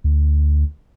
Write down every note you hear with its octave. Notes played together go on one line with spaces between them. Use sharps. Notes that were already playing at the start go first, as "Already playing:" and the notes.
D2